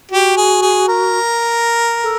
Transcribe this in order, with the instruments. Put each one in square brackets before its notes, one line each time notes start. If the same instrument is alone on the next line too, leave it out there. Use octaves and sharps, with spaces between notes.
[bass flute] F#4 [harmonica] G4
[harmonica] G#4
G#4
A#4
[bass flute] A4